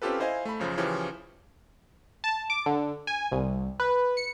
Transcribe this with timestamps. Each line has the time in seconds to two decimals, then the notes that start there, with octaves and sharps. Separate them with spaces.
0.02 C4 C#4 F4 G4 A4 B4
0.20 E4 C5 D#5 F5 G#5
0.45 A3 B5
0.59 B1 F#2 C#3 F3
0.77 C#3 E3 F3 C#4 G4
2.24 A5
2.50 D6
2.66 D3
3.07 G#5
3.32 C2
3.80 B4
4.17 C#7